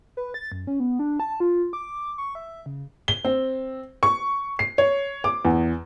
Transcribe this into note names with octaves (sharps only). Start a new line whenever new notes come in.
B4
A6
F#2
C#4
B3
D4
A5
F4
D6
C#6
E5
C#3
G7
C4
C#6
C7
C#5
D6
E2